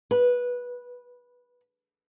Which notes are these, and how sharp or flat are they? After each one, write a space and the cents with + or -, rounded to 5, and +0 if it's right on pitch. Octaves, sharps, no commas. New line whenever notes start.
B4 -15